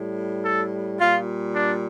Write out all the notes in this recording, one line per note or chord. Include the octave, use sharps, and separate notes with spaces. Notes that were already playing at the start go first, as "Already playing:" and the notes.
Already playing: A2 G3
A4
A#2 G3 F4
D4